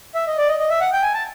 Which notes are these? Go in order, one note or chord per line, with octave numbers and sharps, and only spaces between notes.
E5
D#5
D5
D#5
D#5
E5
F#5
G5
G#5
A5